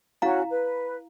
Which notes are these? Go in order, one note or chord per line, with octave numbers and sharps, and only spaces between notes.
C#4 E4 F#4 F5 A#5
B4